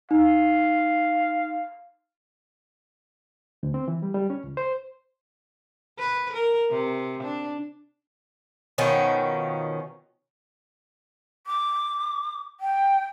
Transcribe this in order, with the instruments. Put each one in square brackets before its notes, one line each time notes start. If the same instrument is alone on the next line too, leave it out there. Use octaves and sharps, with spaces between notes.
[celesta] D#4 [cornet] F5
[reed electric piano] D2
C4
E3
G3
G3
C#4
C#2
C5
[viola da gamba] B4
A#4
C3
D4
[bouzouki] B2 D#3 F3 C#4
[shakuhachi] D6
G5